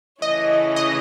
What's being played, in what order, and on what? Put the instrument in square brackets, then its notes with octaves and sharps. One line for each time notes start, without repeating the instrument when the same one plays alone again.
[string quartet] C#3 E3 A3 C#4 [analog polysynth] D#5
[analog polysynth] D#5